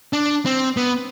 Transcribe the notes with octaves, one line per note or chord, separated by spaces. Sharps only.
D4
C4
B3